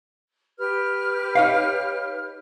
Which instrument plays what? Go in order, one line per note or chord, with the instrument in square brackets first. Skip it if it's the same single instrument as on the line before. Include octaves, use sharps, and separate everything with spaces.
[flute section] G4 B4 F6
[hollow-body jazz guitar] D#4 C#5 F5